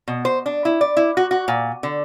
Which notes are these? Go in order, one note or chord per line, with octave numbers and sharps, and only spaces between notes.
B2
C5
D4
E4
D5
E4
F#4
F#4
A#2
D3